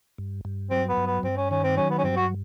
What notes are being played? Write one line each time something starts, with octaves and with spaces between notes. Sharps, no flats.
G2
G2
F#3 C4
B3
G2
B3
G2 C4
C#4
D#3 C#4
C4
F#3 C#4
B3
C#4
G2 C4
F#4